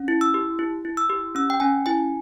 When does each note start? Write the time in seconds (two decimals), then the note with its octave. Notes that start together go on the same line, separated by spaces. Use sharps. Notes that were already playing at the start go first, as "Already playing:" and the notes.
Already playing: C#4
0.08 E4
0.21 E6
0.34 G4
0.59 E4
0.85 E4
0.97 E6
1.10 G4
1.35 C#4 E6
1.50 G5
1.60 C#4 G#5
1.86 E4 G#5